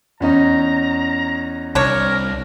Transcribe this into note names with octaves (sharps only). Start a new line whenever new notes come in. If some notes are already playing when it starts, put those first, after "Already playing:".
E2 C#4 D#4 A#5
C2 D4 A#4 C#5